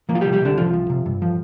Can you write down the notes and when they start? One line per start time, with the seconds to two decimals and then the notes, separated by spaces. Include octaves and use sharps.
0.09 F3 A#3
0.15 F4
0.21 G3 G4
0.25 C3
0.33 G3 G4
0.41 C2 D3 D4
0.57 C2 F3 F4
0.73 F3
0.90 C3
1.06 G2
1.22 F3